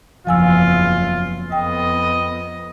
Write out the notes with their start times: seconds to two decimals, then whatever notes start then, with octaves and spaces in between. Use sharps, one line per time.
0.27 F#1 E2 F3 F4 G#5 E6
1.52 F2 B3 D#5 G5